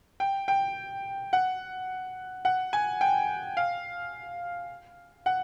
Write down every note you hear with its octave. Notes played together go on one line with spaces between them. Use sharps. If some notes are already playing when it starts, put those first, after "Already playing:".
G5
G5
F#5
F#5
G#5
G5
F5
F#5